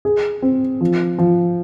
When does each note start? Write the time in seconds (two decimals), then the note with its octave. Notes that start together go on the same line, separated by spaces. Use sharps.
0.05 G#4
0.42 C4
0.81 F3
1.18 F3